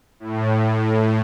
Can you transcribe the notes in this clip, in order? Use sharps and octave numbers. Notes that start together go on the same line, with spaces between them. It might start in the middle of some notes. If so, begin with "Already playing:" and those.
A2